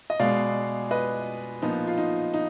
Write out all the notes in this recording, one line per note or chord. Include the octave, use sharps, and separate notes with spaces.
D#5
B2 G#3 B3 D5 F5
B4 D#5
A#2 F3 B3 D#4
F4
D#4
D#4